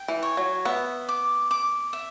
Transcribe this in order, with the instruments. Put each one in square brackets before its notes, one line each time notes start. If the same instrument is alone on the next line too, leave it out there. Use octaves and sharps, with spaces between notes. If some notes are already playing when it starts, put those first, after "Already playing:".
Already playing: [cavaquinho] G5
[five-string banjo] E3
[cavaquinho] C#5
[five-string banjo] F#3
[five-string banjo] B3 [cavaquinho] E5
[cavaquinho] D6
D6
E5